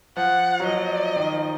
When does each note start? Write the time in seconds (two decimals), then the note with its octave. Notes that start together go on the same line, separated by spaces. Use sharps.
0.17 F3 F#5
0.60 F#3
0.66 F3 D#5
1.16 D#3
1.33 F3